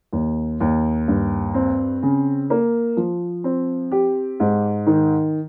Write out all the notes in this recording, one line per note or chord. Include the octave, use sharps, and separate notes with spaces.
D#2
D#2
G2
C4
C#3
A#3
F3
C4
G4
G#2
D#3